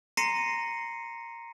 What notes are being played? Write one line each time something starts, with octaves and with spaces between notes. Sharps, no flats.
A#5 C6 A#6 C7 C#7 D#7